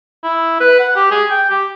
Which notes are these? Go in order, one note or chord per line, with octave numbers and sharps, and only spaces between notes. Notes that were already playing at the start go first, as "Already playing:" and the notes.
E4
B4
F#5
G4
G#4
G5
G4